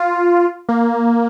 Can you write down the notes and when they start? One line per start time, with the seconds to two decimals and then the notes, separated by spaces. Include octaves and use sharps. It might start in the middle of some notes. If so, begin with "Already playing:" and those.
Already playing: F4
0.69 A#3